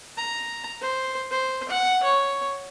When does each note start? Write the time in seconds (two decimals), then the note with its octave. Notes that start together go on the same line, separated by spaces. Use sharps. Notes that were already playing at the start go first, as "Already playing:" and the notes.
0.17 A#5
0.82 C5
1.31 C5
1.69 F#5
2.03 C#5